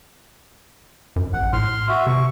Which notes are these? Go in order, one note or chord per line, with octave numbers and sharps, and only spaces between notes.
F#2
A#1 F#5
A2 C6 F6
F#4 E5
C3 C#6